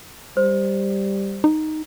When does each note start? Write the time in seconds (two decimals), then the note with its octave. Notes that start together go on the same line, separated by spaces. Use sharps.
0.37 G3 C5
1.44 D#4